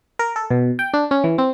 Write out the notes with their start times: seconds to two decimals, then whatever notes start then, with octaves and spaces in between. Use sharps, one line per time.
0.19 A#4
0.36 A4
0.51 B2
0.79 G5
0.94 D4
1.11 C#4
1.24 E3
1.38 C4